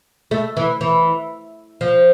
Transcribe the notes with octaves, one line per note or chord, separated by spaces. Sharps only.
A3
E3
E3
F3